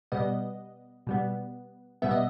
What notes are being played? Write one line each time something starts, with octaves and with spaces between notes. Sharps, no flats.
B2 G3 B3 D#5
B2 G3 B3
B2 G3 B3 E5
D#5